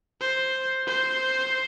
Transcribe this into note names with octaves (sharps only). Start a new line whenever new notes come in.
C5
C5